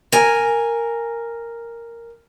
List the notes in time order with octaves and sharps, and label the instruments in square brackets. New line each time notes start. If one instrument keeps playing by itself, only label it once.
[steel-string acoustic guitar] A#4 G#5